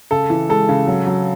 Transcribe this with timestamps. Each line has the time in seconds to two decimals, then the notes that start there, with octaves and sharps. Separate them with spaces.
0.11 C#3 A4
0.30 E3
0.49 G#3 A4
0.69 C#3
0.87 F#3
1.07 F#3